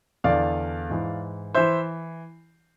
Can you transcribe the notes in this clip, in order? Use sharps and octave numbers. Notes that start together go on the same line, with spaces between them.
E2 D3 D5 F5
G#2 E3
E3 C5 E5